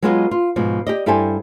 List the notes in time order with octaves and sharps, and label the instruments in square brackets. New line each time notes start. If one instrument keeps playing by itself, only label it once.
[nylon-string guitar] F#3 G#3 B3 F4 F#4 D#5
F4
G#2 B2 F3
G4 D5 D#5
G2 E4 G4 A4 C5 G#5